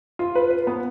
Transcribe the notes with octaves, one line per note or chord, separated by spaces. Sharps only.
F4
B4
B4
B3